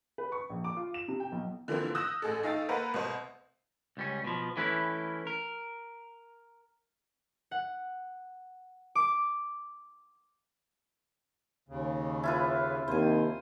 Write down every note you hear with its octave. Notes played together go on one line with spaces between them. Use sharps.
B4
C#6
A#1
D6
F4
E7
C3
G5
B1
D3 E3 F3 A#3 C4
D#6 E6 F#6 G6 A#6 E7
A1 G#4 A4
A3 D#4 F5 G5 E6 A6
A#3 B4 C5 F#5 A#5
C2 B2 C5
C#2 G3 C#4
B2 F3
E3 A3 C#4 E4 B4
A#4
F#5
D6
D#2 C#3
E4 F4 B4
D#2 C3 C5 G#5